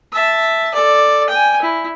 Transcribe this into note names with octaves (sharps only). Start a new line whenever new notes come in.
E5 A5
A4 D5
G5 G#5
E4